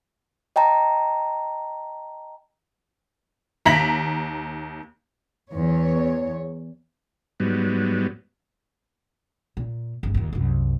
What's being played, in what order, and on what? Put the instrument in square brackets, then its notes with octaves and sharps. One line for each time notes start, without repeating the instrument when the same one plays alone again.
[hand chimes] D#5 G5 A5 A#5
[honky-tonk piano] D#2 A#5 A#6 B6 F#7
[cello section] E2 C#5
[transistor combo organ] G#2 F#3 G3 B3
[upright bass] A#2
G1 C#2
A#1 D#2
C2 F#2